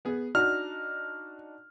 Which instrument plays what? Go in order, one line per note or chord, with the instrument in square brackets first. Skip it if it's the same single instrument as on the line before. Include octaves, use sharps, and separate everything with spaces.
[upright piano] B3 G#4
[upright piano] D4 D#4 F#4 [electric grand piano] F6